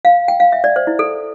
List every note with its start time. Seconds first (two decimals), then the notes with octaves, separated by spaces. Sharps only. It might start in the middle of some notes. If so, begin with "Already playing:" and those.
0.05 F5
0.28 G5
0.40 F5
0.52 E5
0.64 D5
0.76 C5
0.87 E4
0.99 A4